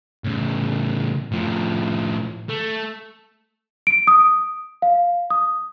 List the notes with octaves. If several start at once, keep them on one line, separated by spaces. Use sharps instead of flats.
A2 C#3
A2 F3
A3
D7
D#6
F5
D#6